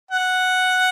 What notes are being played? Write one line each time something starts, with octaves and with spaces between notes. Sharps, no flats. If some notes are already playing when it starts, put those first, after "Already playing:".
F#5